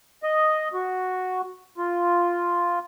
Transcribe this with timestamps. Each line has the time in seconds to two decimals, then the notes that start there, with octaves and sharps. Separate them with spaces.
0.23 D#5
0.73 F#4
1.78 F4